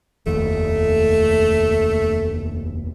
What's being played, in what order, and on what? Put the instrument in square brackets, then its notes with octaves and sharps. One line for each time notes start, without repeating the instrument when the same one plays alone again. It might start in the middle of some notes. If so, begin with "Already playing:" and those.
[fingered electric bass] F1 D#2 [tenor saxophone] A3